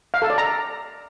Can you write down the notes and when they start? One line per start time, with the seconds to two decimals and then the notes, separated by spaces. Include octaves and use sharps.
0.14 F5
0.22 A4
0.30 D5
0.38 A#5